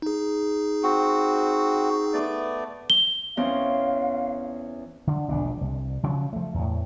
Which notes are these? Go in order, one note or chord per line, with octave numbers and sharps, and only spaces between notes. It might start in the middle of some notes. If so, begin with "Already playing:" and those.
D#4 G#4
C4 F#4
A3 B3 D5
G7
E2 C4 C#4 F5
D3
E1 A#1 B3 D4
C2
C#3 F3 F#3
F3 A3
E2 A2